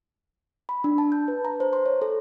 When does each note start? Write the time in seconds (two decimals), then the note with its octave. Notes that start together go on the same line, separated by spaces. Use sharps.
0.69 B5
0.84 D4
0.98 A5
1.12 G6
1.28 B4
1.45 A#5
1.60 C5
1.73 C6
1.86 C#5
2.02 A4